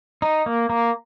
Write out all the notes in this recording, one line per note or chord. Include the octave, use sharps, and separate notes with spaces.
D#4
A#3
A#3